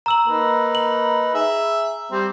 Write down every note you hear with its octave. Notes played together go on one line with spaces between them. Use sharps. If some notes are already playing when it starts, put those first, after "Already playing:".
A#5 E6 F#7
A#3 D#4 B4
F#7
G#4 E5
G3 C4